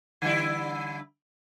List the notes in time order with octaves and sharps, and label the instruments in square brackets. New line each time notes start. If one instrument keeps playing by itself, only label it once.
[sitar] D3 G3 E4